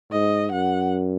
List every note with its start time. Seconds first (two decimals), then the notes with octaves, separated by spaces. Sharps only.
0.12 G#2 D#5
0.52 F#2 F#5